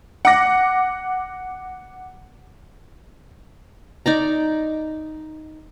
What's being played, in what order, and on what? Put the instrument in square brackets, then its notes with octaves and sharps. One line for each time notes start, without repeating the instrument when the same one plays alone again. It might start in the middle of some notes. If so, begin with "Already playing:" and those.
[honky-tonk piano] F#5 D6 A#6
[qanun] D#4 D5 A#5